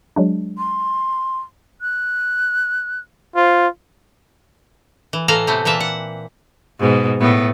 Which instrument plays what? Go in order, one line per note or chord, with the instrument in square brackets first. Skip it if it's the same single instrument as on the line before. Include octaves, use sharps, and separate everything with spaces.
[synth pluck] F#3 G#3 D4
[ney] C6
[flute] F#6
[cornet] F4 [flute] C5
[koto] E3
A2 E3 F4 A4 F5 A#5
C3 E3 A3 B3 C4
A#2 E3 F4 E5 A5
F#5
[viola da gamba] G#2 B2
A2 B3